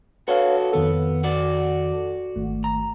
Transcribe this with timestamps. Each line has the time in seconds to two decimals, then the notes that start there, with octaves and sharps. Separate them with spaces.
0.28 F#4 A4 B4 C#5 F5
0.73 F2 D#3 B3 A4
1.24 F#4 D5
2.36 G#1 A3
2.64 A#5